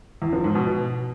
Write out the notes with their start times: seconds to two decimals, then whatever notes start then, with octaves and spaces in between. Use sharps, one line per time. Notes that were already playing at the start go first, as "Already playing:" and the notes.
0.22 E2
0.33 F3
0.44 G#2
0.55 B2